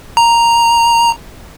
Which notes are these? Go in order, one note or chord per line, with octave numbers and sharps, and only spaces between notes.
A#5